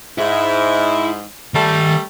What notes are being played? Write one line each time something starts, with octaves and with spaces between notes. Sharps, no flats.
G#2 E4 E5
D#3 G3 A3 A5